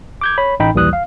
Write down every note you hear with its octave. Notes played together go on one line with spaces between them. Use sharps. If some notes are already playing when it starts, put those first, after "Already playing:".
D6 G6 G#6
C#5 B5
A1 D#4 G5 B5
A#1 D#2 E3 G3 D#6 F#6
F5